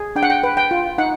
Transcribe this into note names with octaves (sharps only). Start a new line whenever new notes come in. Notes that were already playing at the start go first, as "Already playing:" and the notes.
Already playing: G#4
D4 G5
F#5
G5
B4
G5
F4
D#4 F#5